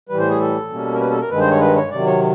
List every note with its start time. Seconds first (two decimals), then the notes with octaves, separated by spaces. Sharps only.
0.09 A2 E3 G3 B4
0.19 C5
0.29 G#4
0.40 A4
0.70 B2 G3 A#3 C#4
0.94 A#4
1.00 B4
1.11 A4
1.20 A#4
1.30 G2 D#3 G#3 B4
1.41 C5
1.51 C#5
1.61 B4
1.76 C#5
1.91 C3 D#3 F#3 D5
2.06 C#5